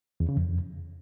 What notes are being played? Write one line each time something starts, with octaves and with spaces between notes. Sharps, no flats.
E2
C#3
F2